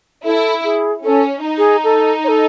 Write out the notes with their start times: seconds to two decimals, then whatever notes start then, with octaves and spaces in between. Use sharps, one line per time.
0.25 E4 A4
0.64 G#4
1.04 C#4 A4
1.45 D#4
1.58 G#4
1.84 A4
2.24 C#5
2.28 A4